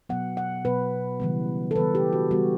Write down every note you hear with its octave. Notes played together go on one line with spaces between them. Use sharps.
B2 F#3 B3 F#5
F#5
B2 F#3 B3 B4
C#3 E3 G3 B3
A4
C#3 E3 G3 B3 B4
G4
F#4
C#3 E3 G3 B3 F#4